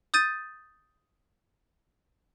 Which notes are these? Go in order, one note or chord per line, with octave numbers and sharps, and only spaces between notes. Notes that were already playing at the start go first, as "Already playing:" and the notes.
D#6 G6 A6 D#7